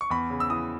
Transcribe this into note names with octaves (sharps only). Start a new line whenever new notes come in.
C#6
E2 B5
C#3
E6
E3 D#6